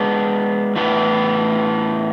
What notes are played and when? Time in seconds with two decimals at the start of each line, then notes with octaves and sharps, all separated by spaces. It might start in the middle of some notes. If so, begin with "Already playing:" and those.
Already playing: G#3 B3 D4
0.76 A2 E3 B3 D4